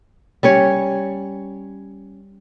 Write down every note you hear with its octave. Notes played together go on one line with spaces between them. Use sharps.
G3 C#4 C#5